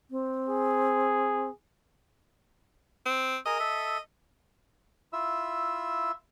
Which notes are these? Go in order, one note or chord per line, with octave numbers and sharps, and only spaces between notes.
C4
G#4
C4
G#4 A#4 D#5
A4 E5
E4 F4 E5 E6